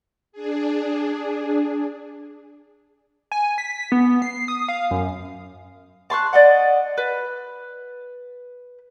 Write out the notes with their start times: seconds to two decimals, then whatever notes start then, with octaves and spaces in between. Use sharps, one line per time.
0.32 D4 G#4
3.32 G#5
3.58 B6
3.92 B3
4.22 C7
4.48 D#6
4.68 F5
4.91 F#2
6.10 A5 C6 C#6 F#6
6.33 D5 D#5 F#5
6.98 B4